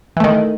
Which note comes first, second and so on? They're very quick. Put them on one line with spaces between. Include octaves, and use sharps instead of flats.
E3 A3 D#3